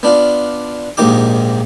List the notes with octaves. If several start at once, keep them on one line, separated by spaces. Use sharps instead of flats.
B3 D4 F4
A#1 G#2 A#3 D#4 G4 D6